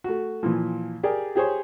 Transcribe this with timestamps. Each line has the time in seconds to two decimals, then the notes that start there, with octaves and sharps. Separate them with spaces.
0.04 A3 F#4
0.43 A#2 E3 F3
1.03 G4 G#4 A#4 D5
1.36 G4 G#4 C5 C#5